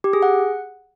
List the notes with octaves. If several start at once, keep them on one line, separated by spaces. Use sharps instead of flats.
G4
G#4
F#5